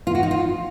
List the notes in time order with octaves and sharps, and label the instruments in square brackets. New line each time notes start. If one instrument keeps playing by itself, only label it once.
[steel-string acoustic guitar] F4
F#4
D#4
F4